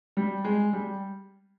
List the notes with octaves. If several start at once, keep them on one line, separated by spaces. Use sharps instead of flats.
G3
G#3
G3